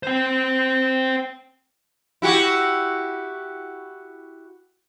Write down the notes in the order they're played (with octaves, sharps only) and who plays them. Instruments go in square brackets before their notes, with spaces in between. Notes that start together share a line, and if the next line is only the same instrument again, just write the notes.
[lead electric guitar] C5 G5
[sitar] E4 F#4 G4